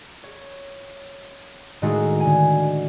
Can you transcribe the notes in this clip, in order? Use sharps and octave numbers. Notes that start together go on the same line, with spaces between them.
C#5
A2 D#3 G#3 A3 D#4 F#4
D3 G#5